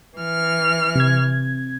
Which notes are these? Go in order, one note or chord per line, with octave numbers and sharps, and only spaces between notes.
E3 F6
C3 G#6